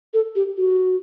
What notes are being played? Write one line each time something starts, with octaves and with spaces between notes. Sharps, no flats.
A4
G4
F#4